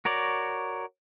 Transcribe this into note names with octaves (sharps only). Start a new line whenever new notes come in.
F#4 A#4 C#5 D5